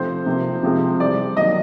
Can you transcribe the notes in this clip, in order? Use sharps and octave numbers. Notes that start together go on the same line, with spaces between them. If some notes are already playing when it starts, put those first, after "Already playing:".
Already playing: C3 F3 A3 C4 C5
C3 F3 A#3
C3 F3 G#3 C4
C3 E3 G3 D5
D#3 F#3 A#3 D#5